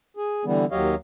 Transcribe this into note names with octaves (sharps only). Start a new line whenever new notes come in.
G#4
D3 E3 G3 B3
D#2 F#3 G4 C#5 D#5 F5